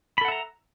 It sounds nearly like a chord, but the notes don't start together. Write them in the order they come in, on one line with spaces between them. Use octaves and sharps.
B5 A4 F#5 E5 A#5